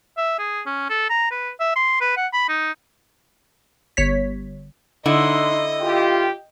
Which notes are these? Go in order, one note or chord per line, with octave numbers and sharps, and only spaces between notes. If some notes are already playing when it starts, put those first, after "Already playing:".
E5
G#4
C#4
A4
A#5
B4
E5
C6
B4
F#5
B5
D#4
G1 C#5 B6
D3 D#4 E4 D#5 C6
F4 G4 G5